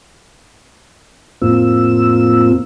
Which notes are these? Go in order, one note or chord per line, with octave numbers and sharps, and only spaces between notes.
F2 A2 A#3 C4 F4 E6